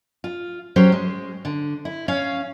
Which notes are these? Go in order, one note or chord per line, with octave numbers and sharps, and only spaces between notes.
F4
F#3 C#4 G4 C5
G#3
D3
E4
C#4 C#5 F5